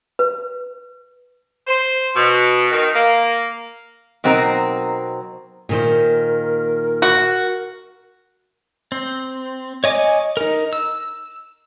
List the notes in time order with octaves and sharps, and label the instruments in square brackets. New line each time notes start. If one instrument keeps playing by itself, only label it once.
[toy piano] B4
[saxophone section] C5
B2
D#3
A#3
[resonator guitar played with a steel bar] B2 F#3 C4 D#4 A#4
[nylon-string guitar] A#2 D#3 C5 [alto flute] A#4
[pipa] F#4
[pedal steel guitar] C4
C#5 D#5 G#5 D6
D#4 A#4
E6